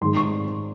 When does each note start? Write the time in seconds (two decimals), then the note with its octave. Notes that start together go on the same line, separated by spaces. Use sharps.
0.01 G#2 D#3 G#3 C6
0.16 C#6